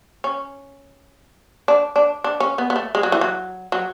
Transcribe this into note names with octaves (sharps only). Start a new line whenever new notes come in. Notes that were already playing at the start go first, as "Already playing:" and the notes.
C#4
D4
D4
D4
C#4
B3
B3
A3
G#3
F#3
E3
F#3
F#3